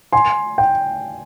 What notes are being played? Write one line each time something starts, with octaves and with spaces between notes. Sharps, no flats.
G#5 C6
G5